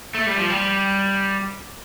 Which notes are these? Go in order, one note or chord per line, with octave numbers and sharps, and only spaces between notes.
A3
G3
F3
G3